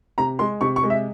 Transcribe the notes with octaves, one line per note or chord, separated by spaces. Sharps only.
C3 A#5
G#3 C6
C3 C#6
C#6
G#3
E5